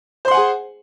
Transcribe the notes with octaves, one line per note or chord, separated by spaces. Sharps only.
G#4 C5 F#5 G#5 C6